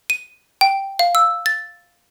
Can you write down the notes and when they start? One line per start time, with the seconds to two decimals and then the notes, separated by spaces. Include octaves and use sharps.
0.10 D#7
0.61 G5
0.99 F5
1.15 E6
1.46 A6